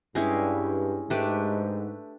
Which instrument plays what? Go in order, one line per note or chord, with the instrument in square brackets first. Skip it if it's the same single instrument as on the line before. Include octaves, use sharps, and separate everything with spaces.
[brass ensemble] G2 [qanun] G#3 C#4 E4 G4
[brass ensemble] G#2 [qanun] A3 D4 G4 B4